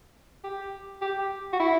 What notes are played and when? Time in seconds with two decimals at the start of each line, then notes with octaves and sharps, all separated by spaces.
0.44 G4
1.01 G4
1.53 F#4
1.59 E4